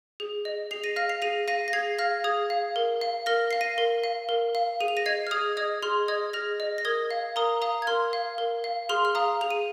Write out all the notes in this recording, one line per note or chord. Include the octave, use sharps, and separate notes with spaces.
G#4
D#5
G#4 C7 F7
A#6 D#7
F5 F6 A#6
C7 F7
G#4 A#6 D#7
F5 A#6 D#7
A#6
G#4 G#6 C7
F5 F6 A#6
G#4 D#6 G#6
F5
A#4
F5
A#4 F6 A#6
F5 C7
A#6 D#7
A#4
F5
A#4
F5
G#4 D#7
F7
A#6 D#7
D#5 G#6 C7
F6
G#4 D#6 G#6
D#5 D#6 G#6
G#4 C6 F6
D#5 D#6 G#6
G#4 F6 A#6
D#5
A#6
A#4 D#6 G#6
F5
A#4 A#5 D#6
F5 A#5 D#6
G#6
A#4 C6 F6
F5
A#4
F5
G#4 C6 F6
F6
F5 A#5 D#6
G#4 F7
D#7